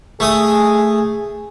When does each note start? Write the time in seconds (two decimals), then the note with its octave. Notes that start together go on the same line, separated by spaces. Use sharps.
0.20 A3 G#4 D#6